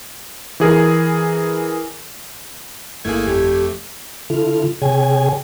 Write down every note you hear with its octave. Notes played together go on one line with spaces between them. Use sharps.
E3 G#4 A#4
G1 A3 A#3 E4 G#4 G#6
F2 A3 G4
D3 E4 F4 A4 F6
C3 G#4 C#5 G5 G#5 G#6